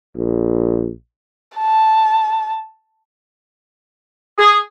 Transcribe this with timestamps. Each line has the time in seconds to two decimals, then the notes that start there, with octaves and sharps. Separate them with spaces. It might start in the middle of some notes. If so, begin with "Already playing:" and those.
0.17 A#1
1.57 A5
4.39 G#4